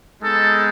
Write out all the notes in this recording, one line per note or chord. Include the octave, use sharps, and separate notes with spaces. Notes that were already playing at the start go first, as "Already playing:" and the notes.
G#3 B3 D#4 A4